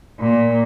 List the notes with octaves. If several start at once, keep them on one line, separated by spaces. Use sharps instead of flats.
A#2